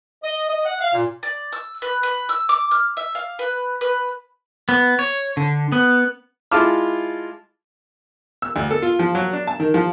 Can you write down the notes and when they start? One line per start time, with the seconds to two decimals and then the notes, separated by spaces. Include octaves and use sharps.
0.24 D#5
0.50 D#5
0.66 F#5
0.81 F5
0.94 A#2
1.23 D5
1.53 E6
1.82 B4
2.03 B4
2.29 E6
2.49 D6
2.71 F6
2.97 E5
3.15 F5
3.39 B4
3.81 B4
4.69 B3
4.99 C#5
5.37 D3
5.72 B3
6.52 G#3 E4 F4 A5 D6 F6
8.42 E6
8.56 D2
8.71 A4
8.82 F4
8.99 F3
9.15 F#3
9.33 D4
9.47 A5
9.60 D#3
9.74 F3